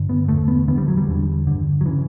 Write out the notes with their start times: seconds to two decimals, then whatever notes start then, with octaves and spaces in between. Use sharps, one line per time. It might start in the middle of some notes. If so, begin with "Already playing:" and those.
Already playing: G2 D3
0.09 B3
0.28 E2 D3 A3
0.48 B3
0.68 E2 D3 B3
0.77 G3
0.88 F#3
0.97 G3
1.08 E2 D3
1.47 G2 D3
1.81 F#3
1.86 C#3 E3